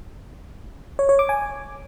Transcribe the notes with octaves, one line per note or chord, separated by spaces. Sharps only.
C#5
C#5
D6
G#5